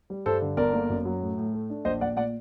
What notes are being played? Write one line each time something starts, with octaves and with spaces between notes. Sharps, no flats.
G3
G2 A4 C5
D3
G1 A#4 D5
A#3
F#2
F#3
A2
A2
A3
D4
A#1 C5 D#5
A#1 D5 F#5
A#2 D5 F#5